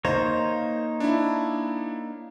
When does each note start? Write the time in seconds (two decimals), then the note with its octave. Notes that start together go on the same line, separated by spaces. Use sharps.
0.05 A#3 D#4 C5 C#5
1.00 D4 E4